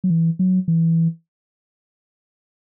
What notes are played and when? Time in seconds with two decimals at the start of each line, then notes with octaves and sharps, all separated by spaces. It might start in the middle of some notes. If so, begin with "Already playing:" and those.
0.04 F#3
0.10 E3
0.39 F#3
0.68 E3